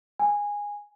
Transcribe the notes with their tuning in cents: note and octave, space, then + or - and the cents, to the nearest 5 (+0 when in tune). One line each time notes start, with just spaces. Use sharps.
G#5 -15